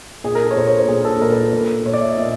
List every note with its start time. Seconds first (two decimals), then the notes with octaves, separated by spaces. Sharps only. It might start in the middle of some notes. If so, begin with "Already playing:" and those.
0.24 A#2 G#4
0.35 A#4
0.45 A4
0.51 C#5
0.57 A#2 C5
0.67 C#5
0.78 C5
0.88 A#2 G#4
1.05 A4
1.22 A#2 A#4
1.32 B4
1.43 A4
1.53 A#2
1.85 A#2 C#5
1.94 D5
2.01 E5
2.09 D#5
2.18 A#2 E5